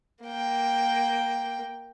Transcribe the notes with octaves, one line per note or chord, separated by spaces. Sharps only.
A#3 G5